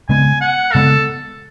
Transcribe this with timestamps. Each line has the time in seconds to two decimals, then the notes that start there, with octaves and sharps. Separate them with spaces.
0.09 C#3 G#3 B3 G#5
0.41 F#5
0.72 C#3 G#3 B3 A4